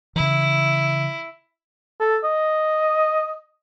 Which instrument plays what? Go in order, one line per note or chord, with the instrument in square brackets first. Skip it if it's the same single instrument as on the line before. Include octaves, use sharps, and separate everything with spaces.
[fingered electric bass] C#3 E3 [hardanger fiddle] E4
[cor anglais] A4
D#5